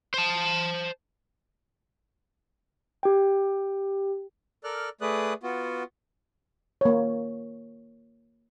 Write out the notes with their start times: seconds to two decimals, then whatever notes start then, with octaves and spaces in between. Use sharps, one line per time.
0.14 C5 A5
3.03 G4 G5
4.64 A4 A#4 D5 F6 F#6
5.01 A3 G#4 B4 D5 D#6 F#6
5.43 B3 F4 F#4
6.81 A#3 C#5